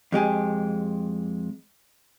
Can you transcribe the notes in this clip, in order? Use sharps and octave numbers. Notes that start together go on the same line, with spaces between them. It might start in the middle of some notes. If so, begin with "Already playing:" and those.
F2 G#3 G4 G#5